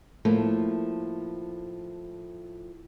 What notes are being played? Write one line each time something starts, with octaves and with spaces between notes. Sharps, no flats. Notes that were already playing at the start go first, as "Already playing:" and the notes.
A2 F3 A3 A#3